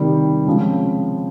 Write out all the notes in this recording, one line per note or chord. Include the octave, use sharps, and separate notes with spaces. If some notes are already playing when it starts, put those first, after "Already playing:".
Already playing: C3 D#3 G3
C#3 F3 G#3 C4